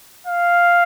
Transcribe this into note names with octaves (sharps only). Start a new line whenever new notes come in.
F5